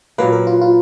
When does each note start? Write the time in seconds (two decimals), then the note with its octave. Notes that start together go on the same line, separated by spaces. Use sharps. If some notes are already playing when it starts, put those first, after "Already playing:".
0.18 A#2 F#3 A#3 B4
0.32 A#4
0.47 F4
0.61 F4